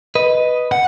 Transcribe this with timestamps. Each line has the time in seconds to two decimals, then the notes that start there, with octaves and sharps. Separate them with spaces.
0.15 B4 D#5
0.72 F#5